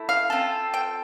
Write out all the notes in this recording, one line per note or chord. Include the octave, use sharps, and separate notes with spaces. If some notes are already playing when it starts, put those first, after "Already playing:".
Already playing: A3 E4
F5
C4 F4 A4
G5